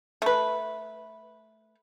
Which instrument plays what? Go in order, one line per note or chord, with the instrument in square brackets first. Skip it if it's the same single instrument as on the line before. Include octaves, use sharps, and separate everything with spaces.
[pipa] A3 B4